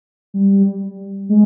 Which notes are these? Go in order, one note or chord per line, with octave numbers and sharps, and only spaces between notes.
G3
G#3